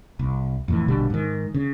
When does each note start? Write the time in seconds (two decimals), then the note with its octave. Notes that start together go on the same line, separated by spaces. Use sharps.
0.19 C2
0.68 F2 A2 E3
0.88 A#1 B2 D3 G3
1.10 G#2 D#3
1.54 C#3